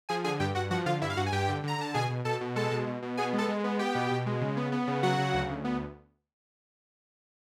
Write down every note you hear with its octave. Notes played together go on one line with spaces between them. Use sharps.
F3 G#4 G#5
D3 G#4 G#5
G2 G4 G5
G2 F#4 F#5
F3 F#4 F#5
D3 F4 F5
G2 E4 E5
F5
G2 F#4 F#5
G#5
G2 G4 G5
D3
D3 A#5
D3 A5
B2 G#4 G#5
B2
B2 A4 A5
B2
G#3 A4 A5
B2
B2
B2
B3 G#4 G#5
G#3
A4 A5
G#3
B3
B3 G4 G5
B2
B2
G#3
C#3
B3
B3
C#3
F#3 F#4 F#5
C#3
D2
D2
B3